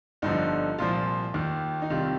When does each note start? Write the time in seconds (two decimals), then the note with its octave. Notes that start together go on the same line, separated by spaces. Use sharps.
0.22 G1 G2 D3 F3 D#4
0.78 C2 A#2 F3 F4
1.34 D#2 D#3
1.82 D#4
1.90 C2 C3 D#3 F4